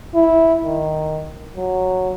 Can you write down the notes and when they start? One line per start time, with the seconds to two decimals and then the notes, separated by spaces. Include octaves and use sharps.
0.15 E4
0.64 D#3
1.56 F#3